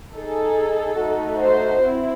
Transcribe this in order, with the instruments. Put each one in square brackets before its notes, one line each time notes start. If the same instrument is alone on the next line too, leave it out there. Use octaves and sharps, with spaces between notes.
[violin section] D#4 G#4 A4
A3 D#4 F#4
C5
C4 E4